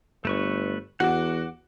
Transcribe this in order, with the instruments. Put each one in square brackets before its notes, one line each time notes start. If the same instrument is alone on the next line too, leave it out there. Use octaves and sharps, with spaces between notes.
[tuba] G1 [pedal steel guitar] A3 B4 C#6
[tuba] E2 [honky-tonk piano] F#4 [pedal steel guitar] F#5 D6